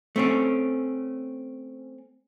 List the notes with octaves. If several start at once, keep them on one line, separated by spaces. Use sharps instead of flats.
A3 C4 C#4